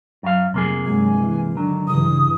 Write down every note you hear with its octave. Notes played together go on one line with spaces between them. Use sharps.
F#2 F#3 F5
F1 C3 A#3 G#4
G2 F#3 G#3 G#5
E3
D3 D#3 F#3 D4
G2 C#3 E3 D#6